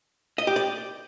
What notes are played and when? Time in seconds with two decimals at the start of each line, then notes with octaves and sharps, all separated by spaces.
0.38 D#5
0.47 G4
0.56 D5